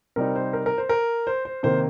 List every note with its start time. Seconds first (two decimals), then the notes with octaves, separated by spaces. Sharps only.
0.16 C3 G3 C4 D#4 A#4
0.35 C5
0.53 A#4
0.66 A#4
0.78 C5
0.89 A#4
1.27 C5
1.45 C5
1.63 C3 D#3 A#3 C5